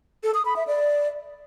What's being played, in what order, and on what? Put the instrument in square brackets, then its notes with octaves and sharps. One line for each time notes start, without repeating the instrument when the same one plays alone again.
[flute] A4
D#6
B5
E5
D5